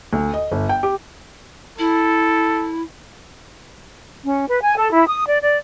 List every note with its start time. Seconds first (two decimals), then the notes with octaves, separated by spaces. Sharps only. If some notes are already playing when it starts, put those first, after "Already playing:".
0.13 D2
0.34 D#5
0.52 G1
0.69 G5
0.83 G4
1.78 E4 A4
4.24 C#4
4.49 B4
4.62 G#5
4.77 A4
4.92 E4
5.07 D#6
5.27 D5
5.42 D5